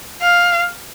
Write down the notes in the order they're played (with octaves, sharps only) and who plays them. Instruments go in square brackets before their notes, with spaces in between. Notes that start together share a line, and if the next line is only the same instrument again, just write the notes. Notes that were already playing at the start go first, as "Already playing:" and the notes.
[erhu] F5